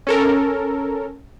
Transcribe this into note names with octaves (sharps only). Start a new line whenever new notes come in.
C#4 A4 A#4